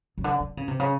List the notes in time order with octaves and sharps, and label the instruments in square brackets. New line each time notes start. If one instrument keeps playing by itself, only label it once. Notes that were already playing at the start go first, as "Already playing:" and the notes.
[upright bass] C#3
D3
D3
C#3
C3
C#3